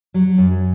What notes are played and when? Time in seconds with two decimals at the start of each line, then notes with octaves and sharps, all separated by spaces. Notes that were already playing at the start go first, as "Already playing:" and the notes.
0.14 F#3
0.38 F#2